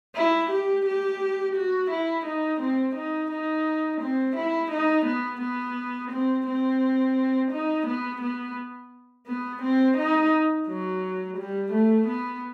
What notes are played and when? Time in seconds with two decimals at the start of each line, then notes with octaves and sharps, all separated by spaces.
0.15 E4
0.50 G4
0.86 G4
1.55 F#4
1.91 E4
2.26 D#4
2.61 C4
2.96 D#4
3.31 D#4
4.01 C4
4.36 E4
4.71 D#4
5.06 B3
5.41 B3
6.11 C4
6.47 C4
7.51 D#4
7.87 B3
8.21 B3
9.27 B3
9.62 C4
9.97 D#4
10.67 F#3
11.37 G3
11.72 A3
12.07 B3